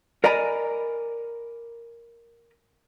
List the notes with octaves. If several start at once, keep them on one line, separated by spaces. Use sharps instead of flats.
A#4 D5 D#5 G#5 A#5 B5